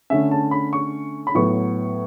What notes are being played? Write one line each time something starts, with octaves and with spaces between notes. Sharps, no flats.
D3 A3 C#4 E5
A5
B5
C#6
B5
A2 F#3 B3 C#6